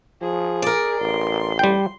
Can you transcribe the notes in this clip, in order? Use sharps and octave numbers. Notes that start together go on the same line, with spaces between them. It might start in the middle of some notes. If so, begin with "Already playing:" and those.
F3 G#4
A#4 D5
A1 C6
G3 G5